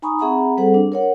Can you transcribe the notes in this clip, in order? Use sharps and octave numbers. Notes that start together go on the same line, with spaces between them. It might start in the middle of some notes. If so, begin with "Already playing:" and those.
D#4 G#5 A#5 B5 C#6 D#6
C4 G#4 E5 F#5 A#5 B5
G3 C4 G#4 A4 C5 F#5
D4
A#4 C#5 F#5